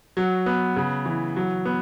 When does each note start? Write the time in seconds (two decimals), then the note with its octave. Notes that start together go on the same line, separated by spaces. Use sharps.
0.17 F#3
0.46 B3
0.76 C#3
1.06 E3
1.36 F#3
1.65 B3